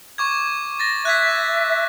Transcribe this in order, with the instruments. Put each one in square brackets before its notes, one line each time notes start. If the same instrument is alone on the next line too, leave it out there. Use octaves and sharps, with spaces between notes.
[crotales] C#6 D6 G#6
A6 A#6
[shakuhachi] E5 [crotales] F#6 G#6 B6